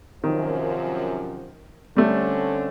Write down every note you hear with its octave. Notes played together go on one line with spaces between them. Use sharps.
F#2 C3 D#3 F3
D3 G3 A3 C4 C#4